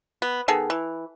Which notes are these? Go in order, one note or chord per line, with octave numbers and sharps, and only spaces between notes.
B3
D#3 B3 G#4 A4
E3